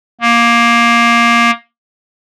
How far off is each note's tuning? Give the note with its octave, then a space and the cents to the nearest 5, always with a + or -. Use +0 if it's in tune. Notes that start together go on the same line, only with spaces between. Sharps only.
A#3 +10